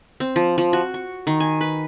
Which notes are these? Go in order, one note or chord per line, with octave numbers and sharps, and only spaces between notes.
C4
F3
F3
F#4
C#6
D#3
G#5
B4